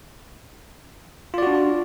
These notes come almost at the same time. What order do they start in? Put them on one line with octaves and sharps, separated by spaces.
F4 D5 F#4 D4